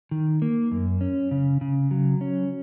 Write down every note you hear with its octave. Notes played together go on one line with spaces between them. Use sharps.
D#3
A#3
F#2
C#4
C#3
C#3
F#3
C#4